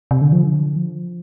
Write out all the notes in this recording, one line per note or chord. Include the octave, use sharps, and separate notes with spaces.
C3
D3
F3
D3
F3